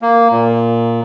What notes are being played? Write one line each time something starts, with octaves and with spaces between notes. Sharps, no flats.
A#3
A#2